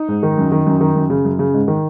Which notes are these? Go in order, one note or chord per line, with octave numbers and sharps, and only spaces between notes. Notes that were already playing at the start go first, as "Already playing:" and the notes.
Already playing: D#4
G#2
D#3
F#2
D#3
F#2
D#3
F#2
C#3
F#2
C#3
G#2
D#3